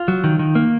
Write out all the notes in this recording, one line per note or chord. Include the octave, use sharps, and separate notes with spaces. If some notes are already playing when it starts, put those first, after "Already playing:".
Already playing: F4
F#3
D#3
D#3
A#3